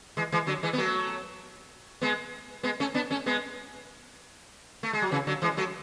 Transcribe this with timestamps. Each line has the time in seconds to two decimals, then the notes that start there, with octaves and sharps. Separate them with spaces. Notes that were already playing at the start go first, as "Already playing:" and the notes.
0.17 E3 G#3
0.32 E3 G#3
0.47 D3 F#3
0.63 E3 G#3
0.73 B3
0.78 F#3 A3
2.01 G#3 B3
2.63 G#3 B3
2.80 A3 C#4
2.94 B3 D4
3.11 A3 C#4
3.26 G#3 B3
4.83 A3
4.93 G#3
5.02 F#3
5.11 C#3 E3
5.27 D3 F#3
5.42 E3 G#3
5.57 F#3 A3